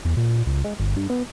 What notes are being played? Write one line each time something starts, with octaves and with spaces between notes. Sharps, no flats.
E2
A#2
C#2
G#3
G1
G2
B3